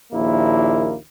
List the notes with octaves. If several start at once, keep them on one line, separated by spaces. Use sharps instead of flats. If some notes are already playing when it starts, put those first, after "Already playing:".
A#1 D#2 A#3 E4